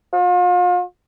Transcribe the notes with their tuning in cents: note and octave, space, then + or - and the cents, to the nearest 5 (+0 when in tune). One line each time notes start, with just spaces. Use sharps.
F4 +40